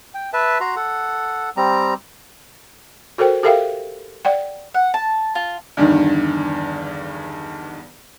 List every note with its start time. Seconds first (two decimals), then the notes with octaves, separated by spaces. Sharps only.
0.14 G5
0.33 B4 E5 A5
0.60 F#4 A#5 C6
0.76 A4 F#5
1.57 G3 C4 A#5
3.18 F#4 A4 A#4 C5 G5
3.43 G4 A4 A#4 E5 F5 G5
4.25 D5 F#5 G5
4.74 F#5
4.94 A5
5.35 F4
5.77 E2 G2 D3 D#3